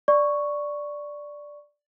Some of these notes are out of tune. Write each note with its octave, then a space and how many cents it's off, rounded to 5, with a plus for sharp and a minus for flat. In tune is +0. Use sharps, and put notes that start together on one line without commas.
D5 +0 C#6 +0